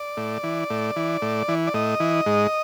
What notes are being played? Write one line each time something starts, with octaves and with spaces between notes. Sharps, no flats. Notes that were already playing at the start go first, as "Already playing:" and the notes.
Already playing: D5
A2
E3
A2
E3
A2
E3
D5
A2 D#5
E3
G#2